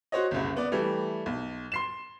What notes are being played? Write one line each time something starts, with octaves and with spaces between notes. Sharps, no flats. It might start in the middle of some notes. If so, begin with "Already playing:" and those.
F#4 C5 C#5 D#5
F#1 C2
B3 D5
E3 G3 A3
B1
C6 C7 E7